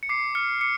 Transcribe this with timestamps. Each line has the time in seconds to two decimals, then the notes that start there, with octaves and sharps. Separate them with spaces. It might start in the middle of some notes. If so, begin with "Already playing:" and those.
0.03 C#7
0.09 D6 C7
0.35 F6 C#7
0.61 D6 C#7